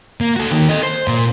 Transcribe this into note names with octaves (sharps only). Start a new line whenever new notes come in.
A#3
F#4 A4
D#3 A#3
A4 D#5
C5
A#2 C6